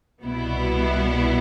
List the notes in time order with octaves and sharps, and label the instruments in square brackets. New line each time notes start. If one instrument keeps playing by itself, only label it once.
[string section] C2 B2 G3 B3 E4